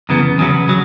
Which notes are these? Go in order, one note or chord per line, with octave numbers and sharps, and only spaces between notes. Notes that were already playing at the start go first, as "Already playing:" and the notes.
F#2 C#3 E3 B3
E2 C#3 F#3 B3
C#3 F#3